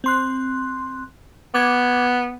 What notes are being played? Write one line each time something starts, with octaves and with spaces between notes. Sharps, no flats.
C4 C6 F#6
B3 D6 G#6